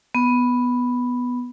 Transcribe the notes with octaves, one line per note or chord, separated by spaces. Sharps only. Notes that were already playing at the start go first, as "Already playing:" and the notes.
B3